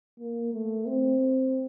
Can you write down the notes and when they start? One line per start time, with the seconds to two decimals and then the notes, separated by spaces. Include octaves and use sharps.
0.20 A#3
0.54 A3
0.87 C4